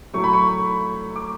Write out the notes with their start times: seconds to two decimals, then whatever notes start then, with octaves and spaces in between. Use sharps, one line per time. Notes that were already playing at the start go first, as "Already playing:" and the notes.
0.14 A2 F#3 A3 C#6
0.24 B5
0.33 C#6
1.16 D6